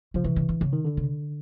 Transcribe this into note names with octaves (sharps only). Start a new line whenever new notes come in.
C#3 F3
C3 E3
C#3
D3
C#3
D#3
D3
C#3